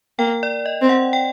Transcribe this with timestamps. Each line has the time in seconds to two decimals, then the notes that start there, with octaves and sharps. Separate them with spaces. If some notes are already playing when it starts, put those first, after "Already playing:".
0.19 A#3 G5
0.43 D5
0.66 D#5
0.82 C4
0.89 F#5
1.13 G5